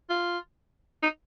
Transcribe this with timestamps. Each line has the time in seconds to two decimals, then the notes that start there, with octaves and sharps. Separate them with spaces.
0.10 F4
1.03 D#4